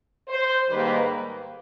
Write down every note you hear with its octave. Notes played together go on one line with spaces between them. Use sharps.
C5
G#2 D#3 G3 A#3 B4